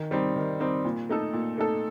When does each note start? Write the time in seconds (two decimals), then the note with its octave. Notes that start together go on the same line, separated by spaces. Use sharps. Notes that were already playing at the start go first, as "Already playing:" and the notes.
Already playing: D#3
0.11 G3 C4 D#4
0.36 D#3
0.60 G3 C4 D#4
0.85 A#2
1.09 A3 D#4 A4
1.33 A#2
1.58 A3 D#4 A4